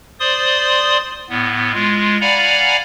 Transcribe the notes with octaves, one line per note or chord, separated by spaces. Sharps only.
C5 D5 C6 D#6
A2 B3
G#3 F4
D5 F5 F#5 G#5 A#5 B5